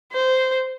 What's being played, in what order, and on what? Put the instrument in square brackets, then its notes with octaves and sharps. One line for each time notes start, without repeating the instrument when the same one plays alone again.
[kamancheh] C5